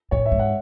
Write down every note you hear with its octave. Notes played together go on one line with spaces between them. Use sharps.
A2 C#5
E5
G#2
F#5